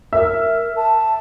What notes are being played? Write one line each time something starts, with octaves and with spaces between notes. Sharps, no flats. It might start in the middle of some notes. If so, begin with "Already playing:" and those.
A#4 E5
A5